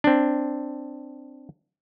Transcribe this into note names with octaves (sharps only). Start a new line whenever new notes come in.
C4 D4